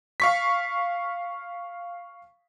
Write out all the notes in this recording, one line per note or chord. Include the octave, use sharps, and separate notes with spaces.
F5 C#6 B6